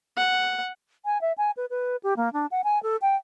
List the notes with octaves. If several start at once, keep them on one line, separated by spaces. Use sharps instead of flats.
F#5
G#5
E5
G#5
B4
B4
G4
A#3
D4
F#5
G#5
A4
G5